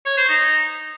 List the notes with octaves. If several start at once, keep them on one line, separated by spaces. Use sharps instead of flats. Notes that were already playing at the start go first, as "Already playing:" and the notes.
C#5
C5
D#4